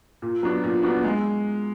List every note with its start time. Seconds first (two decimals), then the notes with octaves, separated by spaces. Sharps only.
0.22 A#2
0.43 F#3 B3 D4
0.64 A#2
0.83 F#3 B3 D4
1.04 G#3